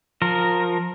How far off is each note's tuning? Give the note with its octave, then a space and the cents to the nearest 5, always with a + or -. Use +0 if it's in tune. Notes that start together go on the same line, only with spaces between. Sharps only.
F3 +20 A#4 +0